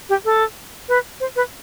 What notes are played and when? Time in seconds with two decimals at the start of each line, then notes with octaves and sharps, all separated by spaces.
0.09 G4
0.25 A4
0.89 B4
1.20 C5
1.36 B4